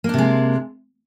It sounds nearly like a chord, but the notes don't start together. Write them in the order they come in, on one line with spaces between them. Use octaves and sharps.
A#3 D4 C3 G#3